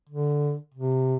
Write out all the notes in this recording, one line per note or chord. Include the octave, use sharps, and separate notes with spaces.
D3
C3